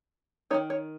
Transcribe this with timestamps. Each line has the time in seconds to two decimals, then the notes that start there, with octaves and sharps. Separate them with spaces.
0.51 D#3 A#3 D#4 C#5
0.70 C#5